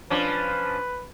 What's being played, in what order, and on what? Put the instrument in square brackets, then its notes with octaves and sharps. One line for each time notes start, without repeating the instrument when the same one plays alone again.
[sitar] F3 C#4 D4 [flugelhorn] B4